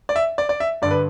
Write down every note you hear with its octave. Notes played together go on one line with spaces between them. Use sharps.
D5
E5
D5
D5
E5
G2 D3 D5
B4